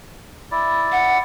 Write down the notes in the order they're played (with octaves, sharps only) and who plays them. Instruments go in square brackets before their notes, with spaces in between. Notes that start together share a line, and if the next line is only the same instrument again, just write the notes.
[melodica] E4 D5
[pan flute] F#5